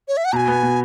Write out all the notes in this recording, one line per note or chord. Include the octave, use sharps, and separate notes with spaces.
C#5
E5
F#5
B2 G#5 A#5
B3
B2